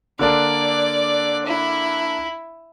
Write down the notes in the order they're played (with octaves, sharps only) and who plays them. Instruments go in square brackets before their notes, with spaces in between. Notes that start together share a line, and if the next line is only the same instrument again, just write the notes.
[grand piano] D3 A#3 D4 [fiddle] D5
[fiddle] E4